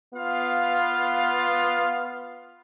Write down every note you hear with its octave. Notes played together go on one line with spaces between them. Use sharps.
B3 F4 F5